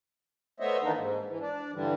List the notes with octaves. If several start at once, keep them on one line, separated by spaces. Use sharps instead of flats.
A3 B3 C5 C#5 D#5 E5
D#3 E3 A#3 B3 D4 D#4
G#2
E3
D4
G2 D3 E3 G3